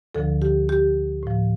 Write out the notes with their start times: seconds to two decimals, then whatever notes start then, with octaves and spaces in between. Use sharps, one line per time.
0.15 D2 D3 F3 A4
0.42 G4
0.69 G4
1.23 A2 F3